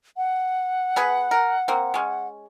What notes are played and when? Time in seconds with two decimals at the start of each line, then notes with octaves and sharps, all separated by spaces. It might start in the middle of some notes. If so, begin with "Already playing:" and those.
0.17 F#5
0.96 B3 G#4 B4
1.31 A#4
1.68 A#3 C4
1.94 G#3 C#4